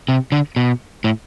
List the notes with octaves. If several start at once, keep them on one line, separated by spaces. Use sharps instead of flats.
C3
D3
B2
A2